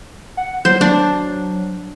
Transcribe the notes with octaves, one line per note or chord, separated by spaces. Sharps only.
F#5
F#3 C5
D4